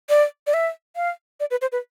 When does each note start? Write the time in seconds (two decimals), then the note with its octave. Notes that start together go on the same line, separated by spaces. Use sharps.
0.09 D5
0.47 D5
0.54 E5
0.96 F5
1.40 D5
1.51 B4
1.62 C5
1.72 B4